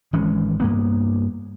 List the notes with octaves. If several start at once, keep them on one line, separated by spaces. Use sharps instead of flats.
G#1 E3 G#3 C#4
G2 A#3 B3